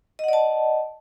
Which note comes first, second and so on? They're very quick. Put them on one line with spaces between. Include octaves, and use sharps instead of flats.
D#5 F#5 D5 A5